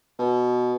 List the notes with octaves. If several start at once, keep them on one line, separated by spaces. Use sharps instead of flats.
B2